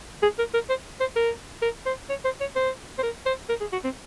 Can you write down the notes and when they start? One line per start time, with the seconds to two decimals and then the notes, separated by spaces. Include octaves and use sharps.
0.23 G#4
0.39 A#4
0.54 A#4
0.69 C5
1.01 C5
1.16 A#4
1.62 A#4
1.86 C5
2.10 C#5
2.25 C5
2.41 C#5
2.56 C5
2.99 C5
3.03 A#4
3.26 C5
3.49 A#4
3.61 G#4
3.73 F#4
3.84 C4